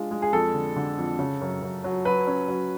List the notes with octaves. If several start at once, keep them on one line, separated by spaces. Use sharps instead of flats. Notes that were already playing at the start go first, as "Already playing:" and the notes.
Already playing: G#3 D4 F4
G#3
G#4
F2 A4
D3
D3
F2
C#3
F#2
F#2
F#3
F#3 B4
C#4
F#3